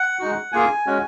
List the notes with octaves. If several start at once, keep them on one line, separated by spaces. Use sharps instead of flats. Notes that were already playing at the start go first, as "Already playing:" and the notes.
Already playing: F#5
G#3 D#4 F#4
A#3 F4 G#4 G#5
G#3 C#4 F#4